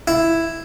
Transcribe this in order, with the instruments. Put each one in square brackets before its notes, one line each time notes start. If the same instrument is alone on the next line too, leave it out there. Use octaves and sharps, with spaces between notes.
[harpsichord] E4